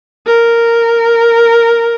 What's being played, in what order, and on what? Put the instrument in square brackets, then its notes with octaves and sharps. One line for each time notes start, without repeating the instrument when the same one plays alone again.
[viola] A#4